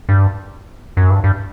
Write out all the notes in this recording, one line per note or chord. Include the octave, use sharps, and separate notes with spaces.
G2
F#2
G2
G2